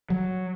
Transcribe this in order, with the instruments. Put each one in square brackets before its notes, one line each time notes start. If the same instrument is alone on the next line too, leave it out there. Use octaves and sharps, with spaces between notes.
[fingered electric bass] F#3